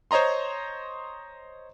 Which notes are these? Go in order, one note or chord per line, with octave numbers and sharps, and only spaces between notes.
C5 C#5 D#5 A#5 C6